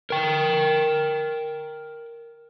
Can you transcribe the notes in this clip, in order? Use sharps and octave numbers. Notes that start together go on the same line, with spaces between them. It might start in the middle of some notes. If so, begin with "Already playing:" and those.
A#4 G5